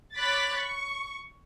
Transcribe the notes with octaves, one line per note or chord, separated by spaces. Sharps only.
C#5 B5 D6 F#6 A6 B6
C#6